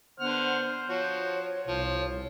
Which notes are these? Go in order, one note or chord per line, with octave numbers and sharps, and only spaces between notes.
D3 B3 C5 F#5 F6
F3 F#4 C#5
C2 F3